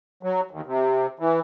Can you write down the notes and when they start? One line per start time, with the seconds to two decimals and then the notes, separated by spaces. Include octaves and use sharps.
0.23 F#3
0.51 D#2
0.66 C3
1.19 E3